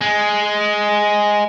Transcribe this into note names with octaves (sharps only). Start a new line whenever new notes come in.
G#3